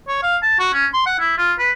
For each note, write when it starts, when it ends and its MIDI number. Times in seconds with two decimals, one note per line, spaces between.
0.08 0.20 73
0.23 0.37 77
0.43 0.58 81
0.59 0.69 66
0.74 0.87 61
0.94 1.02 84
1.06 1.20 78
1.20 1.34 64
1.38 1.53 65
1.59 1.71 71